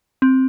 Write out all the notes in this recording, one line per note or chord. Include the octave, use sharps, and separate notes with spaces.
C4